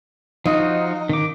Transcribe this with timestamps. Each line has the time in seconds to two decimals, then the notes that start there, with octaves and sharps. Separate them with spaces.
0.46 F3 D#4 F4 F#4
1.09 D#3 D6